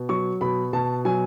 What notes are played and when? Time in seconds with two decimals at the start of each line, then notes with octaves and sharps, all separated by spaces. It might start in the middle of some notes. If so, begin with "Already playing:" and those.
Already playing: B2
0.09 F#3 C#6
0.41 B2 B5
0.73 B2 A5
1.05 F#3 G#5